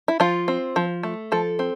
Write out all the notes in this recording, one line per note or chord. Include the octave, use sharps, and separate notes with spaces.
E4
F3 F4
C4
F3
A3
F3 A4
C4